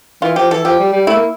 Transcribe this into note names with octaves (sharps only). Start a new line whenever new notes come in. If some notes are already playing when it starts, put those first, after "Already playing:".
E3 F4
F3 G4
E3 A4
F3 G4
G3
G3
A3 E4
A#3